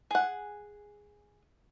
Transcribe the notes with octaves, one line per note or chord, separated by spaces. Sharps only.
G#4 F#5